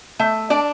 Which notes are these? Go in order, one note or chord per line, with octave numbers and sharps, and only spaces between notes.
A3 E5
D4 D5